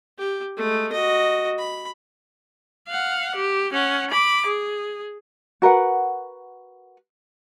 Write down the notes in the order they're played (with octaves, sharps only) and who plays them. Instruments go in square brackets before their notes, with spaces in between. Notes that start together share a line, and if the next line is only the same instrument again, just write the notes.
[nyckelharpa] G4
G#3 A3
F#4 D#5
B5
[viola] F5 F#5
G4
C#4 F#5
B5 D6
G#4
[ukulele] F#4 A#4 B4 F#5